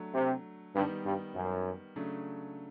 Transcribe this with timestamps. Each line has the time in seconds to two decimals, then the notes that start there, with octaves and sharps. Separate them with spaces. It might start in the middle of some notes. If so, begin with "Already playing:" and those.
Already playing: F#3 A3 D4
0.14 C3
0.75 G2 D#3 G3 B3
1.05 G2
1.36 F#2
1.96 C#3 F#3 A3 D4